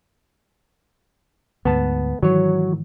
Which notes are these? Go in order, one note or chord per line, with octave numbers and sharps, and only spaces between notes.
D2 G#2 B3 A5
G#2 D#3 E3 F#3 C#5